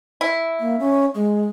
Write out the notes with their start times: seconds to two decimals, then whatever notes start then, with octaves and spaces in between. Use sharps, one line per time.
0.21 E4
0.60 A#3
0.80 C#4
1.15 G#3